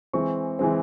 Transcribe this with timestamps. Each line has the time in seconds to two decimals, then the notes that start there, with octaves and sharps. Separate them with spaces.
0.13 E3 G#3 C4 C#6
0.59 E3 G#3 C4